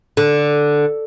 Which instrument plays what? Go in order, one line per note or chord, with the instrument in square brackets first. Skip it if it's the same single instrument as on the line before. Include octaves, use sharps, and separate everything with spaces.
[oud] D3